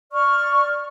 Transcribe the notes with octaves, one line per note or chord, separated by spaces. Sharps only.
D5 C#6 F6